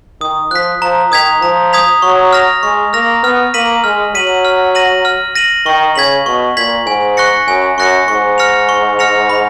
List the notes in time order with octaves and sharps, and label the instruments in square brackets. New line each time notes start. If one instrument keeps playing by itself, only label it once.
[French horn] D#3 [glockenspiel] D#6
[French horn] F3 [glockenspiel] F#6 B6
[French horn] F3 [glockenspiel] A#5
[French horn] D#3 [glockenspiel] D#6 G#6 B6 F7
[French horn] F3 [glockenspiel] A#5
[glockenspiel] D#6 G#6 B6 F7
[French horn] F#3 [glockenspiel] C#6
[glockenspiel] F6 A#6 F7
[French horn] G#3 [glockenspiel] C#6
[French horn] A#3 [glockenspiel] F6 A#6 F7
[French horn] B3 [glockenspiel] F6
[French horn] A#3 [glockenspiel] B6 D#7 F#7
[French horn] G#3 [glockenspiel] F6
[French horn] F#3 [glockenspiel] B6 D#7 F#7
[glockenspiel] F6
A#6 D#7 F#7
F6
A#6 D#7 F#7
[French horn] D#3 [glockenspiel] C#6
[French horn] C#3 [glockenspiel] G#6 B6 F#7
[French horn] B2 [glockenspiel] C#6
[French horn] A#2 [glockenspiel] G#6 B6 F#7
[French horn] G#2 [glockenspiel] G#5
[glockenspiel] C#6 F#6 A#6 C#7
[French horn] F#2 [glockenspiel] G#5
[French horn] F#2 [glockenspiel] C#6 F#6 A#6 C#7
[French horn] G#2 [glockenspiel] C#6
[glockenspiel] F6 A#6 C#7 F7
C#6
F6 A#6 C#7 F7
B5